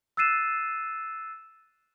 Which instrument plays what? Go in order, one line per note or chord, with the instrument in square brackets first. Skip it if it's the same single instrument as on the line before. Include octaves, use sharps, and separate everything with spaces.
[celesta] E6 F#6 A6 C7 D#7 E7